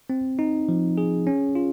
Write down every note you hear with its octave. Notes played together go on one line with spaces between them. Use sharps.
C4
D#4
F3
G#4
C#4
F4